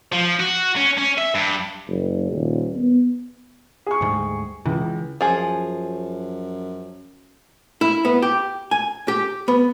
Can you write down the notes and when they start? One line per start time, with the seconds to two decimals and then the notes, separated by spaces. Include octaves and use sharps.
0.12 F3
0.39 F#4
0.76 C#4
0.97 C#4
1.18 E5
1.35 G2
1.88 F#1
2.32 D#1
2.76 B3
3.86 G#4 C#6
4.01 D2 G#2 G3
4.66 C#2 E3
5.21 F#2 F3 G#4
7.81 E4
8.05 B3
8.22 G4
8.71 G#5
9.08 G4
9.48 B3